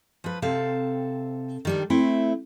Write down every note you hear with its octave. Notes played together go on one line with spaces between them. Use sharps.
F3 B4
C3 C4 A4 F5
D#3 G3 D4
A3 C4 E4